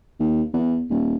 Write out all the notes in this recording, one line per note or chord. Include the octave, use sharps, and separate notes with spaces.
D#2
E2
D#1